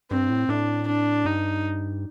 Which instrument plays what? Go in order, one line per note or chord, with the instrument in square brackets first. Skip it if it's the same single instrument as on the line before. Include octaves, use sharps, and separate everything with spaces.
[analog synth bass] G2 [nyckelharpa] C4
[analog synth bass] A2
[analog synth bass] A2 [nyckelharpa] D4
[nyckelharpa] D4
[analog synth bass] G2 [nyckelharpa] D#4